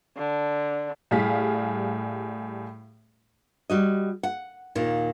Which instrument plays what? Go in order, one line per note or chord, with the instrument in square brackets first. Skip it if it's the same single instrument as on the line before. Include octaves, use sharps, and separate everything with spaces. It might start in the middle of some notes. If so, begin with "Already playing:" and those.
[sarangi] D3
[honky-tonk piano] A2 G3 G#4 F5 B6
[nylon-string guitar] G3 F#4 D#5
F#5
D#2 A#2 D#3